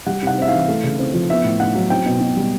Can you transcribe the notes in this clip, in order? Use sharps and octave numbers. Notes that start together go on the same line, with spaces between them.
G3 F#5
C3 F#5
C4 E5
F5
E3
A3
C#3
C4
F3
B3 E5
A2
A2 F#5
F#3
C4 G5
B2
B2
G3